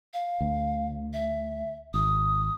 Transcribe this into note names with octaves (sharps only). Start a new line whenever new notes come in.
F5
D2
E5
G#1 D#6